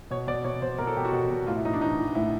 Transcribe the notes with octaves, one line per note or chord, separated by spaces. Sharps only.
B2 C#5
B2 D5
B2 C#5
B2 C5
B2 A#4
A4
B2 G4
F#4
B2
B2
A2 F4
E4
A2 D#4
D4
E3 D#4
E3
A2 E4